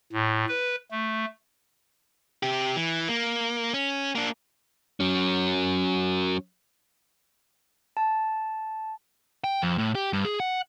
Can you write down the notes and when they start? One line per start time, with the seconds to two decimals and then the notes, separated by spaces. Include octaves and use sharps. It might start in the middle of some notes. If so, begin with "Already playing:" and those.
0.13 A2
0.48 B4
0.91 A3
2.43 C3 G4
2.76 E3
3.08 A#3
3.74 C#4
4.15 A#3 D4
5.00 F#3 C#4
7.97 A5
9.44 G5
9.62 F2
9.78 A2
9.95 G4
10.13 G2
10.25 G#4
10.40 F#5